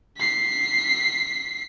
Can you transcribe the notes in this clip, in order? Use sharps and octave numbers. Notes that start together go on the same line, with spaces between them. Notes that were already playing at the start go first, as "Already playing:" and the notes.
B6 C7